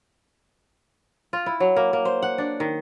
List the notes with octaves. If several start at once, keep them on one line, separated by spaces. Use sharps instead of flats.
F4
E4
F#3
A#3
A#3
C5
F#5
D4
D#3